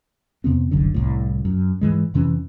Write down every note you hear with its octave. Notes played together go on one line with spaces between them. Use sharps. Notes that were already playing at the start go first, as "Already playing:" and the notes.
F2 C3 B3 C4
F#1 C2 F#2 D3
C2 A2
F#2
G#2 E3 G#3
F2 C3 E3 C#4